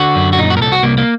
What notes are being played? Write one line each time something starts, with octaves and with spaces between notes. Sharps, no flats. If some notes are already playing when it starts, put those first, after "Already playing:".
Already playing: D3 F#4
F#2
F#4
A#2 D#4
F#4
A#4
C2 A4
F#4
C2 A#3
A#3